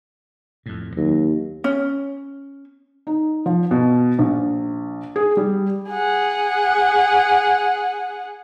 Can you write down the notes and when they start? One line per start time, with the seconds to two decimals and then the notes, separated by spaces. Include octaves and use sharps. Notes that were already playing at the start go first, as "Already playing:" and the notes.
0.66 F2 A2
0.97 D#2 F#3
1.64 C#4
3.07 D#4
3.46 F3
3.71 B2
4.19 A#1
5.16 G#4
5.37 G3
5.90 G#4 F#5